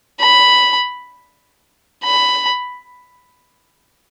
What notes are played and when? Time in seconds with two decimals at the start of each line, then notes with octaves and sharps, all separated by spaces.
0.20 B5
2.04 B5